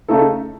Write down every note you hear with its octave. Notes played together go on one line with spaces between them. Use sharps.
C#3 A3 D#4 A4